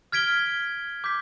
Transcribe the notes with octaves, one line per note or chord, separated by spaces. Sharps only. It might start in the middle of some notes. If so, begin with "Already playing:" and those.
F6 G#6 B6 D7 G7
D6 G6 B6